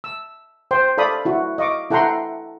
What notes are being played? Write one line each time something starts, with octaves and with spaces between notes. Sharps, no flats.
E6
C5 G5 C6
A4 D5 F5 B5 D#6
E4 F#4
D#5 F5 C#6 D6
E4 A4 F#5 G5 A#5 C6